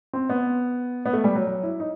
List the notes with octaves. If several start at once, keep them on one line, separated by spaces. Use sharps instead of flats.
C4
B3
B3
A3
G3
F#3
F#3
E4
D#4